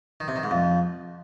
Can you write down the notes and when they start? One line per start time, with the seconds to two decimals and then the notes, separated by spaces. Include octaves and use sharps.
0.20 D#3
0.28 C3
0.36 D#3
0.43 G#2
0.51 F2